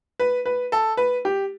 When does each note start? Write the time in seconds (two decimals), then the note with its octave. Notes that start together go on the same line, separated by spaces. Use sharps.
0.20 B4
0.46 B4
0.72 A4
0.97 B4
1.25 G4